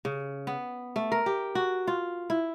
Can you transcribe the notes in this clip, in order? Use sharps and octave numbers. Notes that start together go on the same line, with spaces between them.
C#3
B3
A3
A#4
G4
F#4
F4
E4